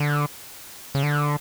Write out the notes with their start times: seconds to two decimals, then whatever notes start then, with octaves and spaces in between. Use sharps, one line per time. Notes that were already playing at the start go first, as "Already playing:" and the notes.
Already playing: D3
0.95 C#3
1.03 D3